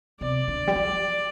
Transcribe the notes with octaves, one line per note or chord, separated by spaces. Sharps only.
C3 D5
D3
G3
F3